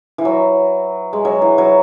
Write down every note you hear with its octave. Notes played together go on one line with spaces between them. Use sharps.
E3
F#3
G#3
F#3
E3
F#3